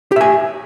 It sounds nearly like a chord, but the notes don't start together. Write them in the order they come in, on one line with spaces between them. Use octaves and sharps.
G4 E5 G#5